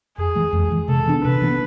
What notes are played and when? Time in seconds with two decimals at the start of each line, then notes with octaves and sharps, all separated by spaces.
0.18 F2 G#4
0.35 E3 G#3
0.53 F2
0.71 E3 G#3
0.88 C3 A4
1.06 E3 B3 D4
1.24 C3 B4
1.42 E3 B3 D4